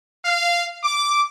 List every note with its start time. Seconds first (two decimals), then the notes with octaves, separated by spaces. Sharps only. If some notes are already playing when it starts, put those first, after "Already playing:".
0.25 F5
0.84 D6